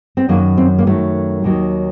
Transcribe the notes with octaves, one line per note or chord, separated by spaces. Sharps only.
C4
F#2 D#3 F#3 A#3
C4
A#3
F#2 D#3 F#3 A3
D#2 D#3 F#3